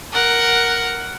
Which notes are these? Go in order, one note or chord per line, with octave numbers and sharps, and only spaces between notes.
A#4 F#5